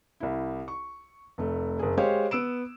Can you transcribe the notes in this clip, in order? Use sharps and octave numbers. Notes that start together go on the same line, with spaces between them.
C2 E4
C#6
F1 A3
F#1 G#4
G#3 G4 C5 C#5 F5
B3 E6 D7 E7